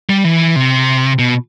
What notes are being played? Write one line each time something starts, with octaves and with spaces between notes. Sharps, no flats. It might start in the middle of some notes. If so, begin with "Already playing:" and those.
G3
E3
C3
B2